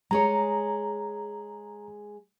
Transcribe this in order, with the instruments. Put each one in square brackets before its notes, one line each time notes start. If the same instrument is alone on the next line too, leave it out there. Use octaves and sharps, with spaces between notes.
[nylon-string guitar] G#3 G#4 C#5 [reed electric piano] A#5